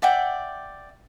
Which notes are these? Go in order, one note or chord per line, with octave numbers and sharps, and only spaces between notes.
D5 E5 F#5 G5